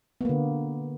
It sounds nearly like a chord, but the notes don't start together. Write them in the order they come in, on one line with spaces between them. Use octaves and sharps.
B3 A#3 D3